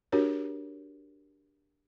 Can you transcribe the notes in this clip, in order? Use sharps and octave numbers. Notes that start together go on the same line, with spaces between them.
D4 F#4 G4 A#4 C#5